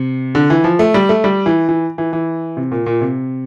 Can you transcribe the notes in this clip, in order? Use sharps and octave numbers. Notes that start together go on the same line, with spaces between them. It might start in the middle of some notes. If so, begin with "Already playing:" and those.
Already playing: C3
D3
E3
F3
A3
G3
A3
G3
E3
E3
E3
E3
C3
A#2
A#2
C3